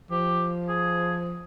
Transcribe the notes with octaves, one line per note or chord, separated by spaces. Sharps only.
F3 G4
G#4